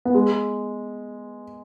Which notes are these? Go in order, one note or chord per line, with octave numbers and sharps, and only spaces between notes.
B3
G#3